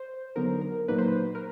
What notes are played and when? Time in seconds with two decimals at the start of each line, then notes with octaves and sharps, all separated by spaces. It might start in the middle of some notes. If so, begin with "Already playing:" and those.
Already playing: C5
0.36 D3 F#3 B3 D#4 A#4
0.61 A#4
0.88 A#2 F#3 A#3 D#4 B4
0.98 C5
1.08 B4
1.35 A#4